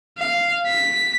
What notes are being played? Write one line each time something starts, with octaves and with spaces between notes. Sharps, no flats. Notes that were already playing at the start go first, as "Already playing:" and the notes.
F5
B6